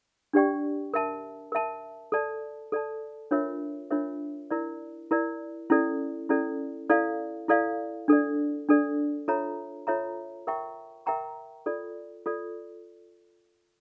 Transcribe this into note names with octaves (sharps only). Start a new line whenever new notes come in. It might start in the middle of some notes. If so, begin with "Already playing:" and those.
D4 G4 D5 G5 C#6
A#4 E5 A5
A#4 E5 A5
A4 D5 A5
A4 D5 A5
D4 F4 A#4 C#5 E5
D4 F4 A#4 C#5 E5
E4 A#4 D5
E4 A#4 D5
C#4 E4 A4 D5
C#4 E4 A4 D5
E4 A4 D5 F5
E4 A4 D5 F5
D4 A4 D5
D4 A4 D5
F4 A4 C#5 E5 A#5
F4 A4 C#5 E5 A#5
A#4 E5 G5 A#5 C#6
A#4 E5 G5 A#5 C#6
F4 A4 D5
F4 A4 D5